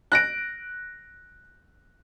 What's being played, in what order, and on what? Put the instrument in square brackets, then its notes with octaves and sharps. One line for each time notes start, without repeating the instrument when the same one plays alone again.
[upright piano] F#6 A#6 D7